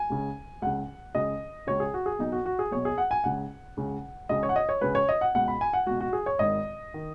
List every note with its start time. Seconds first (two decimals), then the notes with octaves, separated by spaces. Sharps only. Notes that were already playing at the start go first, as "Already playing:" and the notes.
Already playing: G#5
0.10 C#2 C#3
0.62 C#2 C#3 F#5
1.15 C#2 C#3 D#5
1.67 C#2 C#3 C#5
1.80 G#4
1.94 F#4
2.06 G#4
2.19 B1 B2 D#4
2.32 F#4
2.46 F#4
2.59 G#4
2.71 B1 B2 C#5
2.85 G#4
2.98 F#5
3.11 G#5
3.24 C#2 C#3 F#5
3.77 C#2 C#3
4.29 C#2 C#3 D#5
4.43 C#5
4.49 F#5
4.56 D#5
4.69 C#5
4.81 C#2 C#3 B4
4.95 C#5
5.09 D#5
5.21 F#5
5.35 C#2 B2 F#5
5.48 B5
5.61 G#5
5.73 F#5
5.86 C#2 B2 F#4
6.01 F#4
6.13 G#4
6.26 C#5
6.39 G#1 G#2 D#3 D#5
6.94 D#3